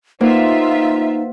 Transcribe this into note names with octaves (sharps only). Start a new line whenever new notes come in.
A#3 D#4 F4 B4 C5 E5 F#5